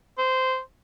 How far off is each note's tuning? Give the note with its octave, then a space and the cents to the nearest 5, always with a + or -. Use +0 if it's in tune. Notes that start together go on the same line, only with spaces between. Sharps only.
C5 -15